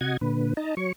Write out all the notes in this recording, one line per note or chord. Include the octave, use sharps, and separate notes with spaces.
C3 F#4 D#5 F#5 G#6
A#2 D3 B4
D#4 D#5 A5 A#5
F#3 C#5 C#6